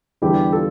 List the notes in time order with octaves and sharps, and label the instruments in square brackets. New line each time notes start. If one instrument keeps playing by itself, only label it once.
[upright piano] E2 D3 G3 B3 [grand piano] E4 G4
[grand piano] F4 A4